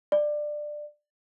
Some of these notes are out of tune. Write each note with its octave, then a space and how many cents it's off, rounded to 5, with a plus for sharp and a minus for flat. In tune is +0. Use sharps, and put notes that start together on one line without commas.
D5 +15